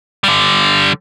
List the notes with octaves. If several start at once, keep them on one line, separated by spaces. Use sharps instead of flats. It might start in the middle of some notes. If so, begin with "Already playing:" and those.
D3 G3